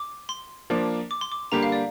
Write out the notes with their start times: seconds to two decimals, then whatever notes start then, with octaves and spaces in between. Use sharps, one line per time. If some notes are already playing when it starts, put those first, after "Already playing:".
Already playing: D6
0.29 C6
0.70 F3 A#3 D4
1.11 D6
1.21 C6
1.32 D6
1.52 D3 G3 A#3 G4 A#5
1.63 F5
1.72 D5